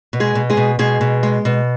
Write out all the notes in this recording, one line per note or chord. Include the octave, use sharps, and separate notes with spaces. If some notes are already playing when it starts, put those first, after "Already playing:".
B2
G#3 G#4
B2
G#3 G#4
B2
B2 G#3 G#4
B2
G#3
B2